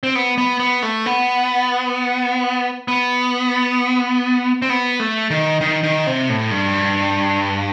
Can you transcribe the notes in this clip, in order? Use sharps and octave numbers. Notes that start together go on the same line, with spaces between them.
C4
B3
B3
B3
A3
B3
B3
C4
B3
A3
D#3
D#3
D#3
C3
A2
G2